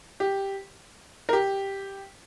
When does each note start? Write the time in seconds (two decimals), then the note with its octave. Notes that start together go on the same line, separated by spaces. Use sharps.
0.20 G4
1.29 A#4
1.33 G4